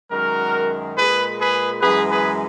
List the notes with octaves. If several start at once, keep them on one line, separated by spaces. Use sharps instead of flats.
F#2 D#3 G#3 F#4 A#4
A#2 G#3 G#4 B4
G#4 B4
F#2 E3 G#3 G#4 B4
G#4 B4